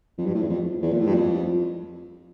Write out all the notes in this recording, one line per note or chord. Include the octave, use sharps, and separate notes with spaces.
F2
G2
A2
E2
F2
E2
A#2
A2
G2
F2